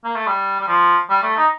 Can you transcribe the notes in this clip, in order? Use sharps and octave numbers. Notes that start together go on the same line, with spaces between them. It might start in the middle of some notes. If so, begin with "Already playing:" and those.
A#3
A3
G3
G3
F3
G3
A3
D#4